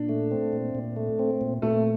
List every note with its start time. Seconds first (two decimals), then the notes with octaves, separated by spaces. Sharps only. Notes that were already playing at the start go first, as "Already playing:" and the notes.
Already playing: A#2 D4
0.09 A3
0.31 C4
0.53 A#2
0.75 A#2
0.96 A3
1.19 C4
1.41 A#2
1.62 A#2 A3